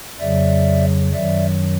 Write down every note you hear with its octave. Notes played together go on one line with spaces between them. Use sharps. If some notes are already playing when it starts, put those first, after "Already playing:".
F2 C#3 F#3 D5 E5
F#2 D#3 F#3 D5 E5